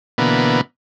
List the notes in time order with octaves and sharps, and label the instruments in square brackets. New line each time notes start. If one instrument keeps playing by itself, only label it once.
[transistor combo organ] B2 D3 E3 A#3 B3